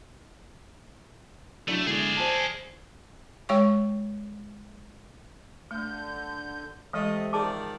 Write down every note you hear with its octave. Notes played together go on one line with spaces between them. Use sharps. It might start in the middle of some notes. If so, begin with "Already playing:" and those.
F#3 A3 D4 E4
D3 G#3 E4 G#4 D5
C5 G#5 A5
G#3 C#5 G5 C#6
D3 A3 G6
C3 E3 G#3 A3 D#5
D#3 F3 G#4 D5 A5 D6